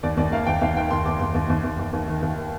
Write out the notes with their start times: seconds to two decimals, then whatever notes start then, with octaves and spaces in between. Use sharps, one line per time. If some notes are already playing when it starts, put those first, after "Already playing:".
0.03 D#2 D5
0.17 D#2 D5
0.32 A#3 F5
0.47 D#2 G5
0.61 D#2 F5
0.76 D#3 G5
0.91 D#2 C6
1.05 D#2 D6
1.20 D#2 C6
1.34 D#2
1.50 D#2
1.64 D#2
1.79 D#2
1.93 D#2
2.08 D#3
2.22 D#2